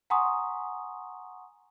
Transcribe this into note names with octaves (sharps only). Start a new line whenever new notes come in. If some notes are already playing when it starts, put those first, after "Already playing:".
F#5 G#5 A#5 C6 C#6 D#6